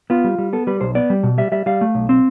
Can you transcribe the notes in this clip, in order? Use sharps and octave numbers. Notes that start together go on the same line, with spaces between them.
B3 F4
G3
G3
B3 A4
G3 B4
B1 C5
B3 D5
G3
B2
G3 E5
G3 E5
G3 F5
A3
B1
C4